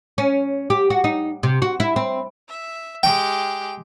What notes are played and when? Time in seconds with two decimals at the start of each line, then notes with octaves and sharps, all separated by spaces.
0.18 C#4
0.70 G4
0.90 F#4
1.04 D#4
1.43 C3
1.62 F#4
1.80 E4
1.96 C4
2.48 E5
3.03 G#3 G4 G5